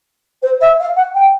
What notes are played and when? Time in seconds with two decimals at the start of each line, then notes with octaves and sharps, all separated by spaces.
0.42 C5
0.60 E5
0.79 F5
0.96 F#5
1.14 G5